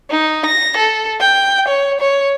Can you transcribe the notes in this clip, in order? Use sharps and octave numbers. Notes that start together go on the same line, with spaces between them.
D#4
A#6
A4
G5
C#5
C#5